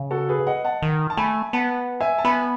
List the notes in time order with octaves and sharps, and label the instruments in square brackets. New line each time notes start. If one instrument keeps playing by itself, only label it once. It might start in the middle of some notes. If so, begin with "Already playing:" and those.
Already playing: [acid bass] C#3
[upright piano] F#4 A4
G#4 B4
D#5 F#5
F#5 A5
[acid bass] D#3
[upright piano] A5
[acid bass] A3 [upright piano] G#5 B5
[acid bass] B3 [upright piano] F#5 A5
[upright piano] E5 G#5
A5
[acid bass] B3 [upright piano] G#5 B5